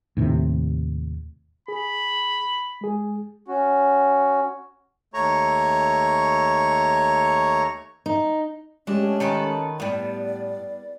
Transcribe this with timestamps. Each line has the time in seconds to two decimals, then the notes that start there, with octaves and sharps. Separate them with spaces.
0.17 D#2 A2 C3
1.68 G#4 B5
2.81 G#3 G#4
3.48 C#4 F#4
5.14 D#2 A3 C#5 A#5 C#6
8.06 D#4
8.87 G#3 A3 C#4 D4 G4
9.20 D#3 A4 B4
9.80 A2 G3 B3 D5